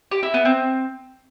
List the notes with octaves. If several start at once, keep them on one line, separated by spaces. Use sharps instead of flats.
G4
E4
B3
C4